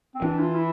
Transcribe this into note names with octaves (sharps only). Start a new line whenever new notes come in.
C4
E3 D4
F4
E4